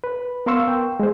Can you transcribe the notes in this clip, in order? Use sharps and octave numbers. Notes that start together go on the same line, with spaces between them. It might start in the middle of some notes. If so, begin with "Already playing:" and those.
B4
B3 A#4 F5 C6 C#6 E6
G5
G#3 C5